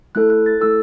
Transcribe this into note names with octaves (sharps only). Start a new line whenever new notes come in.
A3 E4 A4 F#6
F#6
A6
A3 E4 A4 E6